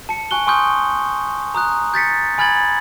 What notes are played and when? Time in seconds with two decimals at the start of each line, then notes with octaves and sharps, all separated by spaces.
0.09 A5 C#7
0.31 G#5 C#6 F#6 G7
0.47 G#5 C6 C#6 D#6 F6 G6
1.54 A#5 D#6 F#6
1.94 G6 A6 B6 C#7
2.38 G#5 B5 F6 G#6 A6 F#7